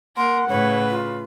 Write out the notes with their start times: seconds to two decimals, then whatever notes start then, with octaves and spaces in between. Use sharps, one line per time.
0.17 A#3 A#4 F#5 C6
0.49 A2 C#3 B4 C#5
0.90 F4